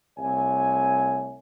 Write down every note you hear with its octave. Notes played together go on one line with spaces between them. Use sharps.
C2 A3 C#5 G#5